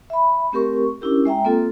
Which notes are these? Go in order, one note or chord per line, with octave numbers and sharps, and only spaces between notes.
E5 B5
A3 C4 G4 A#4 C#6
C#4 D4 E4 G4 A#4
G#3 E5 G5 A#5
A#3 C4 F4 A4